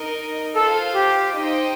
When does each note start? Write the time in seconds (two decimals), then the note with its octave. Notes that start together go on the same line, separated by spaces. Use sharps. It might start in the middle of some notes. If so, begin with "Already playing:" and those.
Already playing: D#4 A#4 D#5
0.55 F4 A4 C5 F5
0.94 G4
1.33 D#4 G4 C5 D#5 G5